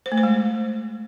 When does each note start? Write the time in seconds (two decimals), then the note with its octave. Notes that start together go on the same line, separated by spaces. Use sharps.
0.06 C5
0.12 A3
0.18 C5
0.23 G#3